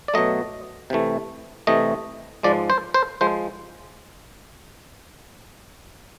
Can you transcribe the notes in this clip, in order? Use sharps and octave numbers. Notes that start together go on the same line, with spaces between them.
D5
B2 F#3 A3 D#5
C3 E3 A3
C3 E3 A3 D#5
G#2 F3 G#3 D5
C5
C5
F3 G#3 C5